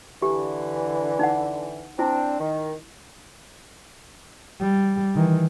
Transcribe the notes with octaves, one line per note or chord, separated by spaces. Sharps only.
D3 E3 G4
D#4 F#5
C4 D4 E4
D#3
G3
D#3 E3